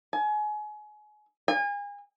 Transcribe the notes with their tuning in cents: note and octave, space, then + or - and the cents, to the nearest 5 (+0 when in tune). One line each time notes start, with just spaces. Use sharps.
G#5 +30
G#5 -35